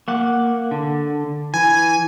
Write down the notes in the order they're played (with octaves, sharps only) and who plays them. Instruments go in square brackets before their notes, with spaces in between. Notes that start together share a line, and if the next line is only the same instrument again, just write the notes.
[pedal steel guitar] A#3 F#5 D6
D3
[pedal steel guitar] E3 [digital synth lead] G#5